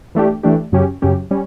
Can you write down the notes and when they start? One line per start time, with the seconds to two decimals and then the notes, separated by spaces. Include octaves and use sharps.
0.15 E3 A3 D4 G4
0.43 E3 A3 D4 G4
0.72 F#2 C#3 F#3 C#4 G4
1.02 F#2 C#3 F#3 C#4 G4
1.31 G3 C#4